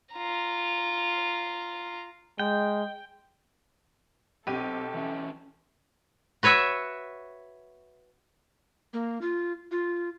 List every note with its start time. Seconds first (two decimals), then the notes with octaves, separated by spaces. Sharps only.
0.13 F4 A#5
2.39 G#3 G5
4.47 B1 C4 G4 A4 D#7
4.94 E3 F#3 C#4 E5
6.43 F#4 B4 C#5 E5
8.93 A#3
9.22 F4
9.71 F4